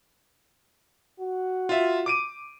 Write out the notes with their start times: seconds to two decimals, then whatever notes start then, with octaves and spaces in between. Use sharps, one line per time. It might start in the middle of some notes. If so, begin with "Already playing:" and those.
1.20 F#4
1.69 F4 E5
2.06 D6 D7 D#7